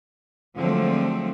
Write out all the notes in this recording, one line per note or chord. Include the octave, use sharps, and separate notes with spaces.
D3 F3 F#3 G#3 A3 C4